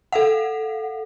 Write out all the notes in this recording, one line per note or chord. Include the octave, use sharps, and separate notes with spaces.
A4 F5 F#5